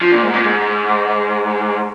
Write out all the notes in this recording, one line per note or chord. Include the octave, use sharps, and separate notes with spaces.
F3
A#2
G#2
A#2
G#2